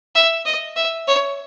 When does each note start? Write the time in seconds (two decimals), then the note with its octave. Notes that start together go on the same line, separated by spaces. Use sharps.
0.15 E5
0.45 D#5
0.76 E5
1.07 C#5